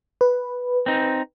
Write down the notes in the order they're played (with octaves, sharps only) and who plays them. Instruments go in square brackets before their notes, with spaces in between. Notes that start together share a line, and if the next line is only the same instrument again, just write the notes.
[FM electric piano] B4
[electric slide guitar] C4 D#4